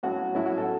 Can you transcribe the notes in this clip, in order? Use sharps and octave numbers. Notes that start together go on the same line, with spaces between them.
A2 F#3 C#4 F#4
A2 F#3 C#4 E4
F#4
A4